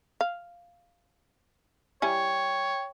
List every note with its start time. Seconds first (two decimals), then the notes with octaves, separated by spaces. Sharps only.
0.21 F5
2.02 G3 E4 C#5 G5 G#5